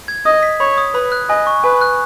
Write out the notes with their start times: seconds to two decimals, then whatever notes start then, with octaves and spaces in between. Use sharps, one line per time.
0.08 G#6
0.26 D#5 D#6
0.43 B6
0.60 C#5 B5
0.78 D#6
0.94 B4 B5
1.12 F#6
1.29 D#5 G#5
1.47 C#6
1.64 B4 G#5
1.81 F#6